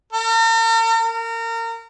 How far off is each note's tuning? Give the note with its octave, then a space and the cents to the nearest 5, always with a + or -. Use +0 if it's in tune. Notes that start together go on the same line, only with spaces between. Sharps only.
A#4 -45
A#4 -30